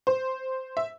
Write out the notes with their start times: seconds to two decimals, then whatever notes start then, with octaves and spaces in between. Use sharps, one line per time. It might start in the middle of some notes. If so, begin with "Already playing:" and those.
0.07 C5
0.77 E5